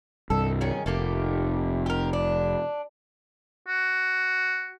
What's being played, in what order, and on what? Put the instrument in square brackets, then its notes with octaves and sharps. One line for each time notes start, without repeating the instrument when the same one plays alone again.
[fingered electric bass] C2 G2 [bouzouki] A4
[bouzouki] D#3 C#4 G#4
[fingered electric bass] F1 [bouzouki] A3 A#3 G4
[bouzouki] G4 A#4
D4
[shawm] F#4